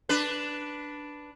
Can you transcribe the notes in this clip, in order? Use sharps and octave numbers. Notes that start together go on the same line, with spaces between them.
D4 B4